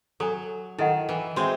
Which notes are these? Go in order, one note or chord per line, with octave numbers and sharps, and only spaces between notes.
F#3 A4 C#5 G#5
D#3 E4 A4 D#5 F#5
E3
G#3 C4 F#4 C#5 E5